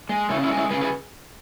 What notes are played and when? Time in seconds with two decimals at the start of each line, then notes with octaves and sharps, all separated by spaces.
0.09 G#3
0.29 C#3 C#4 E4
0.44 C#4 E4
0.50 G#3
0.57 C#4 E4
0.70 C#3 G#4 B4
0.81 G#4 B4